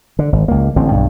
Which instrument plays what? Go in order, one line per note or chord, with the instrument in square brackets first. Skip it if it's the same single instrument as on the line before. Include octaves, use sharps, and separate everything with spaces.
[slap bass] D3
G#1
C#2 A#3
A1 D3 C4
B1 G2